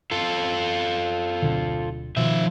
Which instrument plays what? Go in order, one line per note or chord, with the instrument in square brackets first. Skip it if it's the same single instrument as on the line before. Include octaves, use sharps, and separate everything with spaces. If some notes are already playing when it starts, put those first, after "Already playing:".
[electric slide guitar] F4 A4
[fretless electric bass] D1 B2 D3
[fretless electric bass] B2 D#3 [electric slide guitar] F3 E5